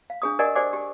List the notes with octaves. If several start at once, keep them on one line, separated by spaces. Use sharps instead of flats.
F5
D4 G#4 D#6
G4 A#4 D5 D#5 F#5 G#5
G4 C5 D5 F#5 G#5 D6
G4 G#5